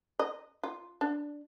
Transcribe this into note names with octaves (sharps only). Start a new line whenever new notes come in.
D#5
F4
D4